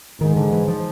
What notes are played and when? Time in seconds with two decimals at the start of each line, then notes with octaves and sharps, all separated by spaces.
0.21 G#2 D#3
0.36 D3
0.52 E3
0.68 F3